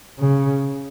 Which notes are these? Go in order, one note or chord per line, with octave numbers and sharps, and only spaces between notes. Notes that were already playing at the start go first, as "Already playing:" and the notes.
C#3